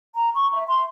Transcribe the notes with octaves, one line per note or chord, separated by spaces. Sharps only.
A#5
C#6
E5
C6